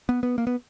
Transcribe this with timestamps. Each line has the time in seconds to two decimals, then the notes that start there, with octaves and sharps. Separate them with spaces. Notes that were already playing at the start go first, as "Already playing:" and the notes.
0.09 B3
0.23 B3
0.38 A#3
0.47 B3